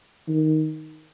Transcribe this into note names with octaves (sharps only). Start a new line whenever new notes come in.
D#3